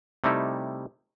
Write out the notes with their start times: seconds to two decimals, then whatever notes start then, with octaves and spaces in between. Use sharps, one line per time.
0.24 C3 G3 A3 D#4 E4